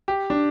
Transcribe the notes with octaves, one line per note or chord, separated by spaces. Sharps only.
G4
D4